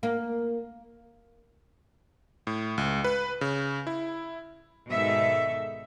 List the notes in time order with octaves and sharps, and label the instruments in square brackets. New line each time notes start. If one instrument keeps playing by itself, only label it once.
[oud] A#3
[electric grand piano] A2
C#2
B4
C#3
E4
[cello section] G#2 B2 D#3 G#3 A4 E5